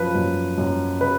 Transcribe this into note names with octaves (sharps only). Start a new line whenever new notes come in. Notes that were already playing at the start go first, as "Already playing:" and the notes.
Already playing: F#2 F3 B4
F#2
F#2
C#3 B4